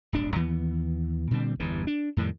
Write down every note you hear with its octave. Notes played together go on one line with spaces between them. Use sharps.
D1 G1 D4
D#2 E3 B3
A#2 D3 G3 C4
G1 E2 G2 E3
D4
F2 A2 D#3 G3